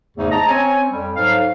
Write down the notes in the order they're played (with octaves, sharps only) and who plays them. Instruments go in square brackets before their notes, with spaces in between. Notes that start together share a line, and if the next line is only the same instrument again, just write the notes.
[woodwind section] E2 G#2 C#3 A3 D#4
D#5 A5 A#5
C4 C#4 C#5 G#5
F2 G3
G#2 F#3 A4 F5